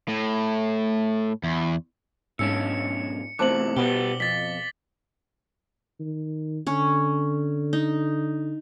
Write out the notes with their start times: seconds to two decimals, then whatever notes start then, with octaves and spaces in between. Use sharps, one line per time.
0.08 A2
1.43 E2
2.39 B1 G#2 C#4 D4 E6 C#7
3.39 E2 A2 C3 C5 A5 D6 F#6 F#7
3.77 B2 G3 B3 G4 G7
4.20 F2 A6 B6
6.00 D#3
6.67 D3 C#4 C#5
7.73 D#4